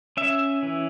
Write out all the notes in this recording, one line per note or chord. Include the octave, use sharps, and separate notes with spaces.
C#4 E5
E3